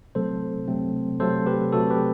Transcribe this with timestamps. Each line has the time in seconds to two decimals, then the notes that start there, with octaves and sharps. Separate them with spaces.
0.15 C3 F#3 A3 C4 A4 C5
0.68 C3 F#3 A3 C4
1.20 C3 F#3 A3 C4 A4 C5
1.46 G4 B4
1.72 C3 F#3 A3 C4 F#4 A4
1.90 G4 B4